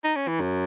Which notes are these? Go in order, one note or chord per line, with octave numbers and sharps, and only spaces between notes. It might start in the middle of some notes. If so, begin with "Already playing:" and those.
D#4
C#4
E3
F#2